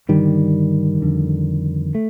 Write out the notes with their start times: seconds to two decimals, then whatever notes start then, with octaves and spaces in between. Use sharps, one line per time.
0.08 G2 D3 D#3 G3
1.02 F2 D3
1.95 A3